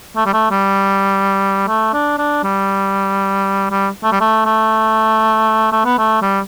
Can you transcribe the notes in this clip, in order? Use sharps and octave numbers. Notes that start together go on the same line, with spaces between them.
A3
G3
A3
G3
A3
D4
D4
G3
G3
A3
G3
A3
A3
A3
B3
A3
G3